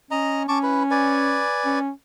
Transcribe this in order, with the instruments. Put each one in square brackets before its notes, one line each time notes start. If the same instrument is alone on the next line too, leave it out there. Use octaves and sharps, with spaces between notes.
[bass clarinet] C#4 [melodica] D#5 A#5
[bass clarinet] C#4 [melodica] A5 C#6 D6
[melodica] E4 B4
B4 D5 G#5
[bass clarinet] C#4